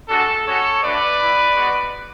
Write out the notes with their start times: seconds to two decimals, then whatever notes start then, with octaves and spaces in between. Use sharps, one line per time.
0.08 G#3 D4 F#4 A4
0.46 G#3 C#4 F#4 A4 C#5
0.82 A3 D4 F#4 B4 D5
1.19 B3 E4
1.55 G#3 B3 F#4